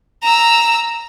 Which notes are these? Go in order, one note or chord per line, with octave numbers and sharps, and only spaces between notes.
A#5 E6